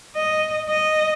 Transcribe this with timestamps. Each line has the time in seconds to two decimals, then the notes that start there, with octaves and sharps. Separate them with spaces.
0.16 D#5
0.70 D#5